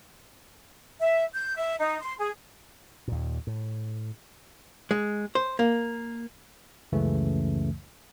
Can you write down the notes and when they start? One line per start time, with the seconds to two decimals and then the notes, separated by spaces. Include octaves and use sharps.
1.00 E5
1.35 G6
1.56 E5
1.80 D#4
2.01 C6
2.18 G#4
3.08 D#2 A#2
3.47 A2
4.91 G#3
5.35 C5
5.59 A#3
6.92 C#2 F#2 C#3 E3 A3